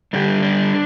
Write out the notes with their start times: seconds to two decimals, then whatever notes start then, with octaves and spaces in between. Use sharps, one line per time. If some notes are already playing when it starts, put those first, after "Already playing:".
0.13 G2 D3 G3 D4
0.43 D4